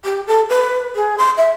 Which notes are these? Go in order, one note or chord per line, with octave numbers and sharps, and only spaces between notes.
G4
A4
B4
G#4
C6
E5